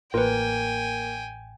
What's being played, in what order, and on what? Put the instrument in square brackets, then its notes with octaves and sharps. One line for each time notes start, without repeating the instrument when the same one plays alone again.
[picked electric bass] A1 [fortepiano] A#3 [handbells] F4 B4 [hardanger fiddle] G5 G#5